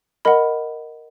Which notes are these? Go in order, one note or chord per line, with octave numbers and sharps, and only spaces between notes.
A#4 D#5 F#5 B5